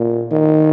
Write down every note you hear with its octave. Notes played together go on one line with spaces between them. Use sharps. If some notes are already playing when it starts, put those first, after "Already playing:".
Already playing: A#2
D#3